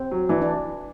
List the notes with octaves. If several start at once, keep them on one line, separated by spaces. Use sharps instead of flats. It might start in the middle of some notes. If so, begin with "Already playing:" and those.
Already playing: C4
F#3
E3 D4
D4